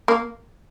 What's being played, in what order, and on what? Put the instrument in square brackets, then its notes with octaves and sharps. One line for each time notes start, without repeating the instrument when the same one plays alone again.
[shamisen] A#3